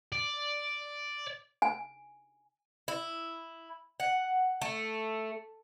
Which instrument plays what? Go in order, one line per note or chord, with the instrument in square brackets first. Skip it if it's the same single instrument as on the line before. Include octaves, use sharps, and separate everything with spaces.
[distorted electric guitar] D5
[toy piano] G#5
[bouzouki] E4
F#5
A3